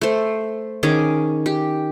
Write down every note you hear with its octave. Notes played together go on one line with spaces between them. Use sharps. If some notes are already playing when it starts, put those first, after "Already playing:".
A3 C5
D#3 C#4 G#4 D6
G4